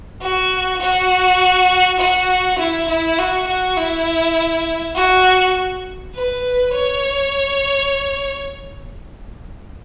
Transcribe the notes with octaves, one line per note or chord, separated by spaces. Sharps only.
F#4
F#4
F#4
E4
E4
F#4
F#4
E4
F#4
B4
C#5